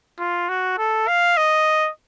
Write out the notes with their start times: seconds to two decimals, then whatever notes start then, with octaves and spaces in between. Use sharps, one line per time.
0.19 F4
0.49 F#4
0.78 A4
1.08 F5
1.37 D#5